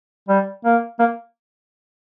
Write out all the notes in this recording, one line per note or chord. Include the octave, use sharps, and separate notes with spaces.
G3
A#3
A#3